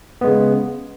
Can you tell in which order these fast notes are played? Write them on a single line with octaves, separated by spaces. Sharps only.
B3 G#3 C#3